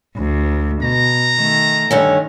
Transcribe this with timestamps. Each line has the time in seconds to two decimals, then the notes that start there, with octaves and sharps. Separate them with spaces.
0.17 D2
0.82 B2 A#5
1.36 D#3 A3
1.91 G2 D3 D#3 C#4